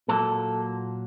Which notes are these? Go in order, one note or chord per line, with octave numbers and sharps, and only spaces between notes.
A#2 F#3 A#3 A4